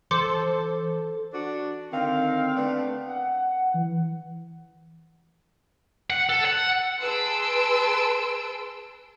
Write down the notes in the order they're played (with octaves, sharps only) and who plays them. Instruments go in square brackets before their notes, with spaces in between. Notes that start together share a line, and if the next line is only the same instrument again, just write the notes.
[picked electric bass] E3 [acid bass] A4 [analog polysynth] C5 [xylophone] C6 D6 C#7
[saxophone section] D4 F#4
[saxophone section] D3 D#3 F5 [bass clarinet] C4
[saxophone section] A3 B3 D4
[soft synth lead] F#5
E3
[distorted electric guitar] F#5
A4
F#5
[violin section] G#4 B4 A5 C6 E6 D7